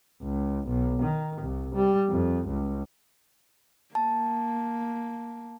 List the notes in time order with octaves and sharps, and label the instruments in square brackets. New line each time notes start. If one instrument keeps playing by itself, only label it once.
[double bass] C#2
B1
D#3
C2
G3
F2
C#2
[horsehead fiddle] A#3 [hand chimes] A5